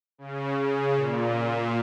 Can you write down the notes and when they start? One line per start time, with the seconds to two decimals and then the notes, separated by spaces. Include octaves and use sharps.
0.18 C#3
0.58 C#3
0.96 A#2